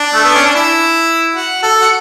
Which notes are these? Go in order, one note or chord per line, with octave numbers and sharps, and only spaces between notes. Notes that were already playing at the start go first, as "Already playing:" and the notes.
Already playing: D4
A3
B3
C#4
D4
E4
F#4
A4
F#4